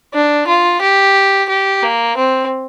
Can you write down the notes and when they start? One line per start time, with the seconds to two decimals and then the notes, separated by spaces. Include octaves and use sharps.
0.14 D4
0.47 F4
0.81 G4
1.49 G4
1.82 A#3
2.17 C4